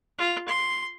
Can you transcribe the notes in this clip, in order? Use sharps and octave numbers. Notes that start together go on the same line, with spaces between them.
F4
C6